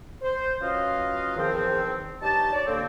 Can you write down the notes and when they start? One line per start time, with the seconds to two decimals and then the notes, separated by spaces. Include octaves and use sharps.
0.22 C5
0.61 F#3 C#4 F4 B4 D#5 F5
1.37 E2 G#2 D#3 F3 C4
2.22 G2 D#4 G4 C#5 A5
2.53 C#5 D5
2.67 D3 A#3 C4